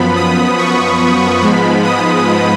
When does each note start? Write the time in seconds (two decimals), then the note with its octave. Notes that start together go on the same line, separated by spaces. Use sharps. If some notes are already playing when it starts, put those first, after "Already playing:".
Already playing: F#2 F3 B3 B5
0.16 D#6
0.59 C#6
1.43 G#2 F3 G#3 B3 B5
1.85 D#6